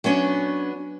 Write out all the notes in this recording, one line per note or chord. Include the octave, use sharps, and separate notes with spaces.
F#3 B3 C#4 D4